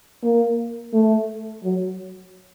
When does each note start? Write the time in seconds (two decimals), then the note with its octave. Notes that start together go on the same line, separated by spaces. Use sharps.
0.23 A#3
0.93 A3
1.64 F#3